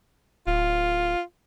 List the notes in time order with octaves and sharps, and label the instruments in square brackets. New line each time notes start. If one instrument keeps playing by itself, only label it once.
[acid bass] D1 [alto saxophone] F4